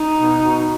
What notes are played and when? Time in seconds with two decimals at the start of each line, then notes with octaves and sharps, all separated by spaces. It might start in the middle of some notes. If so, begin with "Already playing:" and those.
Already playing: D#4
0.16 B2
0.40 B2